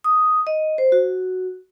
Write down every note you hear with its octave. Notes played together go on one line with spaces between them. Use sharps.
D#6
D#5
C5
F#4